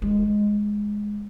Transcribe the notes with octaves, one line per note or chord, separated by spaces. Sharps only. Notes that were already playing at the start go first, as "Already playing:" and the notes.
G#3